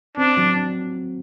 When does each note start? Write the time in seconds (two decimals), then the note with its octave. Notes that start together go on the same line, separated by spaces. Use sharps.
0.17 C4 D4
0.37 F#3